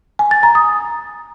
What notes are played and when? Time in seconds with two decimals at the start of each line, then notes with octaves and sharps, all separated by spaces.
0.19 G#5
0.31 A6
0.43 A#5
0.55 D#6